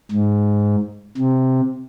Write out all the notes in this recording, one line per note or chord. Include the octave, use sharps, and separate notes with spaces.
G#2
C3